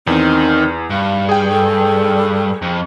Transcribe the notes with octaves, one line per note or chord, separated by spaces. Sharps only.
E2 D#3 C4
G2 F5
G#4 G5
A4
F2